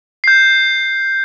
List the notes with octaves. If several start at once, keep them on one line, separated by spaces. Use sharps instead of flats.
G6 C7